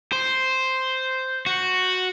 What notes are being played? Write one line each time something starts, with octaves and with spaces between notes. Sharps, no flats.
C5
F#4